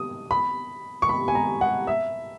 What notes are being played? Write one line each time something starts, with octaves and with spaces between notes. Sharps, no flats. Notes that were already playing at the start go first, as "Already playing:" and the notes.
Already playing: D#6
B5
C#6
B5
G#5
A#5
F#5
E5